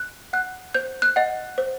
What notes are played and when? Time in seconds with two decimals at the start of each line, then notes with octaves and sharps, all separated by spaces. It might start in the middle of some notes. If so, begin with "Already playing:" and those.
Already playing: F#6
0.33 F#5 F#6
0.74 C5 G6
1.02 F#6
1.16 D#5 F#5
1.58 C5